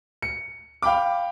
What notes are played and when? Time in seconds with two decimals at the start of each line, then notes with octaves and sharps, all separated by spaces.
0.22 C#7
0.82 F5 G5 B5 D6